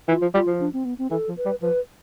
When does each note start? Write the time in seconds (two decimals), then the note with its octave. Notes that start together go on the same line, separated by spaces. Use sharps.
0.08 E3 F4
0.22 F3
0.34 G3 F4
0.47 F3
0.60 D4
0.73 C4
0.85 B3
0.98 C4
1.11 E3 A4
1.28 F3
1.37 B4
1.45 G3
1.62 F3 B4